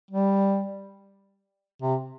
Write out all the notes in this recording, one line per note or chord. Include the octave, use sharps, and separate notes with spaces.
G3
C3